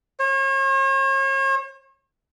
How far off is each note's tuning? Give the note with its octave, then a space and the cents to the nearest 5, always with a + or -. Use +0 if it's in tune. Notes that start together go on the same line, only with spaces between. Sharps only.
C#5 -40